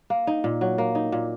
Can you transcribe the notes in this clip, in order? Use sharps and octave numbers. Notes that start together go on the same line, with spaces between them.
A#3
D#4
A#2
F#3
A#3
D#4
A#2